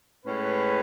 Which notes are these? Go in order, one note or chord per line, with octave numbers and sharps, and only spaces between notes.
A2 G#3 C#4 B4